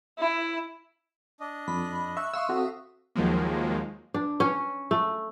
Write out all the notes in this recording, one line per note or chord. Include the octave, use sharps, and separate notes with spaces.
E4
D4 D#5
F2 B5
E5 C#6 E6 F#6
E5 F5 C6 C#6 D#6 E6
C4 F#4 A4
D#2 D#3 F3 F#3 G#3 A#3
D4
C#4
A3